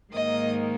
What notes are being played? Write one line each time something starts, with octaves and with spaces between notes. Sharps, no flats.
G#2 D#3 A#3 D#5